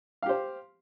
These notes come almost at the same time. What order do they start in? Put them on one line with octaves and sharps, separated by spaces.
F5 G4 C5